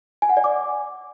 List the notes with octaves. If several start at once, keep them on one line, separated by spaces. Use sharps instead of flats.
G#5
F#5
D5
D6